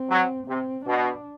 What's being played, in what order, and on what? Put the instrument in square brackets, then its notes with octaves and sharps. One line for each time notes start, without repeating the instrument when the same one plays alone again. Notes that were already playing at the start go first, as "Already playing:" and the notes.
Already playing: [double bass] C4
[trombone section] F#3
[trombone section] C3 [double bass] C4
[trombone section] B2 [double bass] D4